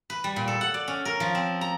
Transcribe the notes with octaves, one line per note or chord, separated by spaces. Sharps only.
B4
G3
A#2
A4
F#5
D5
C#4
A#4
F3
C4
A#5